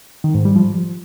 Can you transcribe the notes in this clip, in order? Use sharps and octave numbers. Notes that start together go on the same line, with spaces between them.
D#3
G#2
G3
F3